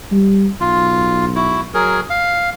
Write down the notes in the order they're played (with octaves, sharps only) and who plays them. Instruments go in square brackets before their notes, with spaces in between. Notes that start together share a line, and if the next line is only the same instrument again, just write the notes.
[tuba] G3
[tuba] B1 [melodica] F4
[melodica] E4 F#4
F#3 G#4 A#4
F5